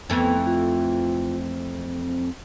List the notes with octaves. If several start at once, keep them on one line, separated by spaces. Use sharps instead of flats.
F2 E3 A3 B3
F4
C4